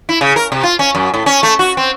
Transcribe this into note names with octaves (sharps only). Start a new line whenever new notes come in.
E4
C#3
A#4
C3
F4
C#4
F#2
A2
C#4
A3
F#4
C4